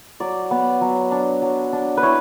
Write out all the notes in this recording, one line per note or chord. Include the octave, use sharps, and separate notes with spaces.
F#3 D5
B3
F#3
D4
F#3
D4
B4
E4 C#5